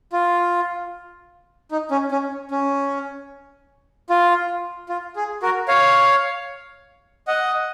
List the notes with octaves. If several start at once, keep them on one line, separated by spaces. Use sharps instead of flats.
F4
D#4
C#4
C#4
C#4
F4
F4
G#4
F#4 A#4
C#5 F5
D#5 F#5